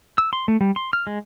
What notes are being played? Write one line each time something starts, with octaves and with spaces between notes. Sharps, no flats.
E6
C6
A3
G3
C6
F6
G#3